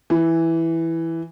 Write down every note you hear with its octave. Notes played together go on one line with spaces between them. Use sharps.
E3